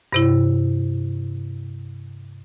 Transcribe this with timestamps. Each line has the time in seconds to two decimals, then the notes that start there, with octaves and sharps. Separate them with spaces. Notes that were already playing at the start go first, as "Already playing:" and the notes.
0.13 G2 C3 E4